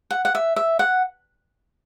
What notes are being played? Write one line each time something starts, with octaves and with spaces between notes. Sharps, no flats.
F#5
F#5
E5
E5
F#5